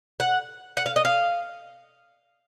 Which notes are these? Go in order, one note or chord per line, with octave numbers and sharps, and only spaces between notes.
F#5
F#5
F5
D#5
F5